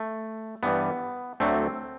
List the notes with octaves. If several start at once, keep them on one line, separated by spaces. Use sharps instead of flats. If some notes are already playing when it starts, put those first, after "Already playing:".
Already playing: A3
G2 E3 G3 B3
D2 D3 F#3 A3 C4